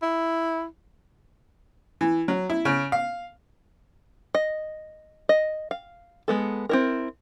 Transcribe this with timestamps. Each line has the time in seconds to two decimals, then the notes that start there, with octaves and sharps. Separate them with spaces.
0.02 E4
2.01 E3
2.28 F#3
2.50 E4
2.65 C#3
2.92 F5
4.35 D#5
5.29 D#5
5.71 F5
6.28 G#3 B3 A4
6.69 C4 E4 A#4